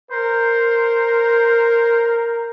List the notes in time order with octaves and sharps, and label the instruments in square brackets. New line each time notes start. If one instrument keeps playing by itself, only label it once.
[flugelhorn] A#4 [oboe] C5